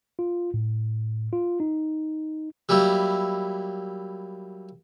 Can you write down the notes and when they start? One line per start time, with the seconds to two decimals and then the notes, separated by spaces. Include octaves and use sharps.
0.19 F4
0.54 A2
1.33 F4
1.60 D#4
2.69 F#3 G3 A#3 E4